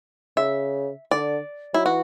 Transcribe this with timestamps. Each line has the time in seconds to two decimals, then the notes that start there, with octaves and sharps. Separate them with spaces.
0.37 C#3 E5
1.11 D3 D5
1.74 F#3 E4
1.86 E3 F#4